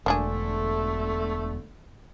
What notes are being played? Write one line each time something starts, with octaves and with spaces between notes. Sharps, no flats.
E1 D3 A3 A#3 D4 G#4